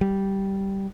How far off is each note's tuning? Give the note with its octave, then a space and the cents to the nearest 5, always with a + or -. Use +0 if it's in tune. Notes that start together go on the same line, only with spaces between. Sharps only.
G3 -10